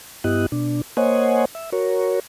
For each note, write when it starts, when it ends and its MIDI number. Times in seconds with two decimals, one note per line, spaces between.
0.24 0.46 43
0.24 0.46 59
0.24 0.46 64
0.24 0.46 67
0.24 0.46 75
0.24 0.46 90
0.52 0.82 47
0.52 0.82 62
0.97 1.45 58
0.97 1.45 72
0.97 1.45 73
0.97 1.45 75
0.97 1.45 78
0.97 1.45 80
1.55 1.70 76
1.72 2.20 66
1.72 2.20 70
1.72 2.20 73